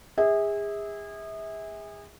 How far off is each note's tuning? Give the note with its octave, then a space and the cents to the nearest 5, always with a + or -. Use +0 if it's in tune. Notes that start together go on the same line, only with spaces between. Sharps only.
G#4 -30 E5 -30